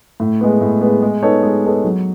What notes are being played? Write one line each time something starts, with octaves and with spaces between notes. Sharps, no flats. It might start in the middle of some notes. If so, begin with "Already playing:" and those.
A2
G#3 B3
A2
G#3 B3
G#3
B3 D#4 A4 C#5
G#3
B3 D#4 A4 C#5
F#3